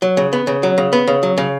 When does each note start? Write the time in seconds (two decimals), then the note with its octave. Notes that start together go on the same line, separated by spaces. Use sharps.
0.02 F#3
0.17 C#3
0.33 B3
0.47 C#3
0.63 F#3
0.78 C#3
0.93 B3
1.08 C#3
1.23 F#3
1.38 C#3